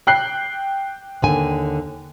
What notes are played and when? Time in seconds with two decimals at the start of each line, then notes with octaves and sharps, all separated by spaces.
0.07 G5 F#6 C7
1.22 D#2 D3 G#5